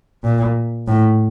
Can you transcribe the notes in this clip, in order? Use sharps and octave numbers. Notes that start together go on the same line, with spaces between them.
A#2
A2